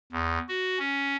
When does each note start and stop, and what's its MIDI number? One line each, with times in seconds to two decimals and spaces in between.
0.12 0.39 40
0.49 0.79 66
0.79 1.16 61